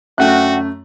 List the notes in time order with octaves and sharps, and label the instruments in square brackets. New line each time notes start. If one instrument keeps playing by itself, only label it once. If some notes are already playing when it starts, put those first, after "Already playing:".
[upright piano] F#2 [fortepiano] A3 F#6 [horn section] D4 F#4 [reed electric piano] E5 F#5 G5